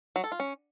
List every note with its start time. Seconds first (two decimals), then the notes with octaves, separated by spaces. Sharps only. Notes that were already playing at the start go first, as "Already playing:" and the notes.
0.16 F#3
0.24 A4
0.32 F4
0.40 C#4